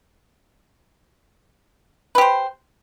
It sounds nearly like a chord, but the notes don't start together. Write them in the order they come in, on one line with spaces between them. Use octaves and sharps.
B4 G4 C5